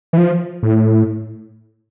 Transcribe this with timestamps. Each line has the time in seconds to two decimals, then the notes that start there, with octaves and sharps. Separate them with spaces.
0.13 E3
0.18 F3
0.63 A2